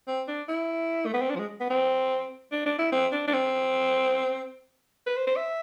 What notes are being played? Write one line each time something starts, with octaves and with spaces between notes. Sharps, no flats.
C4
D4
E4
A3
B3
C4
D4
F3
G#3
B3
C4
D4
D4
E4
C4
D4
D4
C4
B4
C5
C5
E5